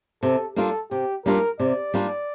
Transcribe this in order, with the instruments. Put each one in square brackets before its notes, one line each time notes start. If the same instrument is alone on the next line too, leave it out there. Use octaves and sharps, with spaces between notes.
[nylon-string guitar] C3 [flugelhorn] A4
[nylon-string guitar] G3 A#3 D4 F4 [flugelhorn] A4
[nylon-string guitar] C3 [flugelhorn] G4
[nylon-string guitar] G3 A#3 D4 F4 [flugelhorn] A#4
[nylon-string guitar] C3 [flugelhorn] D5
[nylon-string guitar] G3 A#3 D4 F4